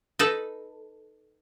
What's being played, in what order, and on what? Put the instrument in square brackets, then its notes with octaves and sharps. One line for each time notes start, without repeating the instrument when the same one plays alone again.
[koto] D#4 A4 B4